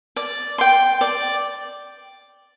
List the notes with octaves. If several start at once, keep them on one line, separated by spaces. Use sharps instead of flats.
D5
G5 C6
D5